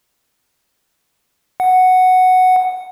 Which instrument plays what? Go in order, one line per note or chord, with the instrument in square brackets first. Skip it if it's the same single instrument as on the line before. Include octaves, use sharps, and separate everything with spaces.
[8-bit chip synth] F#5